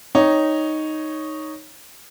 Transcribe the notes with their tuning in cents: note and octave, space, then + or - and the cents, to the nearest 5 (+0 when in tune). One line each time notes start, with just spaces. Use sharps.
D#4 +0 C#5 +0 G5 +0